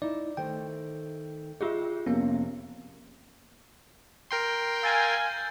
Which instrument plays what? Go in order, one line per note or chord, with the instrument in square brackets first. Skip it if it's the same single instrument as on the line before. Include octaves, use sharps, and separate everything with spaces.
[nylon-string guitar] D#4 E4 [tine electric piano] D5
[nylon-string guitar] D#3 A3 C5 [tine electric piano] G5
[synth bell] F4 G4 G#4 [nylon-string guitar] D#5 E5
[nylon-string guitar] F2 C3 [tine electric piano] A#3 C#4 [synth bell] B3
[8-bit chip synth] A#4 G5 C6
[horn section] F5 G#5 [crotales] E6 G6 A6